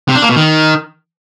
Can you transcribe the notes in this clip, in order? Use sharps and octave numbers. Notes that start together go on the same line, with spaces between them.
C3
D4
A#3
B2
D#3